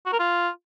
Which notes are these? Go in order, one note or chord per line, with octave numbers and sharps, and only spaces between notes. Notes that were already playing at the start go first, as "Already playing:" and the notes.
F#4
A#4
F4